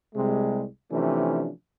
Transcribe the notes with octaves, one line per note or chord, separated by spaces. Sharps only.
C2 C3 G3 G#3
C3 E3 F3 A3 C#4 D4